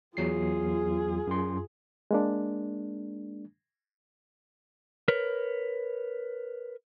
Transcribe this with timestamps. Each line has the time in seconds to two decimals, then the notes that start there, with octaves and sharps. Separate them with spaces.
0.17 E2 F#3 F4 G#4 C7
1.27 F#2 C6
2.11 G#3 A#3 D4
5.08 A#4 B4 C#5